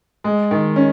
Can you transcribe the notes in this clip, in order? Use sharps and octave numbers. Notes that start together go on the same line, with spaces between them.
G#3
D#3
C#4